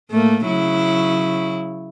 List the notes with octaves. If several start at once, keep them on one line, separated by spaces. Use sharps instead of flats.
A2 A3 A#3
C#3 F#3 E4